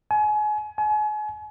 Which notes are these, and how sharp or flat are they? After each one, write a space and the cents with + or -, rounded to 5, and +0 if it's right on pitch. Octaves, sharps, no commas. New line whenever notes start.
G#5 +30
G#5 +35